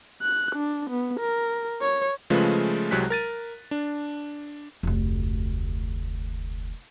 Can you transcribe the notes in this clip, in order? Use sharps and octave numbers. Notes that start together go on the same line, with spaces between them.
F#6
D4
B3
A#4
C#5
C#3 F3 G#3 A3 F4 B4
C2 C3 F#3 G#3 F#6 B6
A#4 A6 D#7
D4
F1 D2